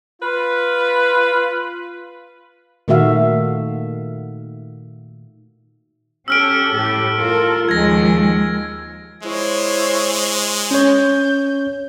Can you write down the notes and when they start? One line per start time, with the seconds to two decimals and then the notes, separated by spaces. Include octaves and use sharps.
0.22 F4 B4
2.88 A#2 D#3 A3 F#4 E5 F5
6.28 C#4 G4 A4 E6 F6 D7
6.72 A2 G4 A4
7.17 F4 A4 A#4
7.69 D#2 F3 G#3 G#6 A#6
9.23 G#3 E4 C5 C#5
10.71 C#4 C#5 G6